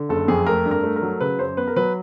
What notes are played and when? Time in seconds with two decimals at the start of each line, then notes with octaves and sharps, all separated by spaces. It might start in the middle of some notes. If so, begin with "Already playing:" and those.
Already playing: D3
0.09 F#1 A4
0.28 F2 G#4
0.46 A3 A#4
0.65 G2
0.71 A#4
0.83 A3
0.96 A#4
1.02 F#3
1.20 C#3 B4
1.39 F#2 C5
1.57 B3 B4
1.67 A#4
1.76 F#3 B4